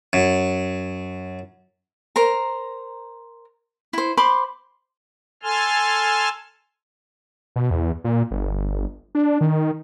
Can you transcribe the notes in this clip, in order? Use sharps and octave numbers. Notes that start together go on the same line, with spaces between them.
F#2
A#4 C5 A#5
E4 C5
C5 B5 C6 D6
A4 G#5 A5 C6 F6
B2
E2
A#2
G1
D4
D#3